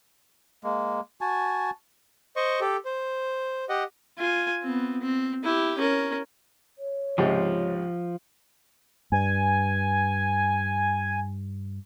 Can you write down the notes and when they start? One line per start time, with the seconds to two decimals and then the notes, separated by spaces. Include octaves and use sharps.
0.64 G#3 A#3
1.21 F#4 G#5 A5
2.36 C5 D#5 C#6
2.61 G4 A4
2.85 C5
3.69 G4 D#5 F#5
4.18 F4 G#5
4.62 B3 C4
5.02 C4
5.43 E4 G4
5.78 C#4 A#4
6.78 C#5
7.18 C#2 G#2 C3 F3
9.12 G2 G#5